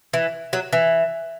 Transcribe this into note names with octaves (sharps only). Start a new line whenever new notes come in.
E3
F#3
E3